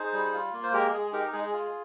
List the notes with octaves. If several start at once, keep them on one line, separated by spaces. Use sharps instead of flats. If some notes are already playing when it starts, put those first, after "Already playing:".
Already playing: D#4 G#4 C5
G3
F4
A#3
C5
G#3 G4 A#4
G#3 G#4
D#4 G4 A#4
G#3 G#4
F4